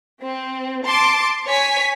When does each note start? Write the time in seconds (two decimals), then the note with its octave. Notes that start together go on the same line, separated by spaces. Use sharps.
0.22 C4
0.85 A5 C6 D6
1.48 C#5 G#5 B6